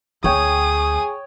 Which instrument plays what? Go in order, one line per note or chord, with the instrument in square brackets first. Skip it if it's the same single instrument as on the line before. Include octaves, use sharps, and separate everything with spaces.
[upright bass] D2 [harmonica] G#4 [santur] C#5 G5 [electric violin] D#6